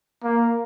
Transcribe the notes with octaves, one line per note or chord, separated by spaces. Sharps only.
A#3